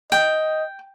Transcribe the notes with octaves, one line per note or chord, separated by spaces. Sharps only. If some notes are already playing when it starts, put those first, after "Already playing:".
D#5 G5